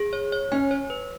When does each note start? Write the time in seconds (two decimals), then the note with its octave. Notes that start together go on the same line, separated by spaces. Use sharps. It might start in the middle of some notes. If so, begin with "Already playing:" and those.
Already playing: G#4
0.13 C#5
0.32 C#5
0.52 C#4 G#5
0.71 C#5
0.90 B4